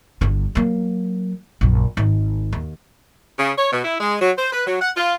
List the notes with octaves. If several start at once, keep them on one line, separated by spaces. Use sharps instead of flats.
G1 D3
F#3 A#3
A#1 F#2
G#1
D#2
C#3
C#5
B2
E4
G#3
F#3
C5
B4
F#3
F#5
F4